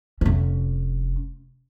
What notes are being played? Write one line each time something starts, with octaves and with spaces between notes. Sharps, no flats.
F1 C#4